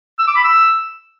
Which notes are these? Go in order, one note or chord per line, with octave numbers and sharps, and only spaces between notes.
E6
D6
B5
E6